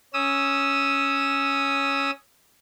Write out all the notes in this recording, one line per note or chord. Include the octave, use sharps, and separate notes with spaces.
C#4 D#6 E6